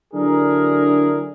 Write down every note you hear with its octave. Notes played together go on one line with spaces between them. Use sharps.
D3 F#3 D4 E4 G#4 A#4